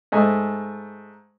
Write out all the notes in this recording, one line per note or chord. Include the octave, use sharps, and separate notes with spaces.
G#2 A3 D#5 G#5